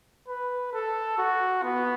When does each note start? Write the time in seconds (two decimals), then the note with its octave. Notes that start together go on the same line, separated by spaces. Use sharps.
0.28 B4
0.73 A4
1.18 F#4
1.63 B3